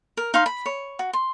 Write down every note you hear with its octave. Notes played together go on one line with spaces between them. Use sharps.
A#4
D#4 F5 C6
B5
C#5
F#4
C6